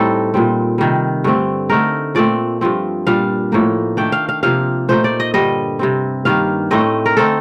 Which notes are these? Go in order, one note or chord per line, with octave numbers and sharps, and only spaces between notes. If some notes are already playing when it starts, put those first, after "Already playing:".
Already playing: A2 G3 C4 D#4 A4
A#2 G3 C4
C3 D#3 G3
G2 D3 A3 C4
D3 A3 D#4 A#4
A#2 A3 C4 D5
G2 F3 C4
A#2 G3 D4 F5
A2 F3 A#3 D#4
D#3 A3 D4 G5
F5
F5
C3 F3 A#3 F5
A#2 A3 D#4 C5
D5
D#5
G2 D3 G3 D#5
C3 G3 C4
G2 D#3 A#3 F5
A2 A3 C4 D#4 D#5
A#4
D3 A3 C4 D#4 A4